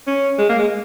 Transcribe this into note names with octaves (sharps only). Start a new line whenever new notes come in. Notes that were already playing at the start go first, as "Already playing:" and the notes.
C#4
G#3
A#3
G#3